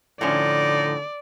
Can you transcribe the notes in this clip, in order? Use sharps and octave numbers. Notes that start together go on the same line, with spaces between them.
A2 D3 F3 C#4 D#4 D5